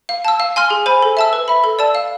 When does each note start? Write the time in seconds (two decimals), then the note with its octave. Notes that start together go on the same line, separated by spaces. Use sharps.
0.09 F5
0.25 A5 E6
0.40 F5
0.56 G#5 C6 F6
0.70 G#4
0.86 C5 G#5 B5
1.02 A4
1.17 E5 A5 E6
1.33 B4
1.48 E5 B5
1.64 A4
1.79 D5 A5 E6
1.95 F5